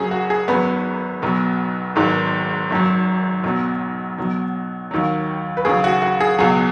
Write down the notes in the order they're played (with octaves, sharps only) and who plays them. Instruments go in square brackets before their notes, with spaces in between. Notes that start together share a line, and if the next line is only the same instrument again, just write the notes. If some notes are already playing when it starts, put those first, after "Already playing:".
Already playing: [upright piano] F#1 F#2 F#3 C#4 G#4
F#4
G#4
G#1 F#2 F#3 B3 B4
B1 B2 F#3
G#1 G#2 D#3 F#3
G#1 F#2 F#3
B1 B2 F#3
B1 B2 F#3
D#2 D#3 F#3
B4
D#2 C#3 F#3 G#4
F#4
F#4
G#4
C#2 B2 F#3 G#4